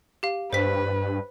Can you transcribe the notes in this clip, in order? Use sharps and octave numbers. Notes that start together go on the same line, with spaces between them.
G4 F5
G2 B4 C5 B6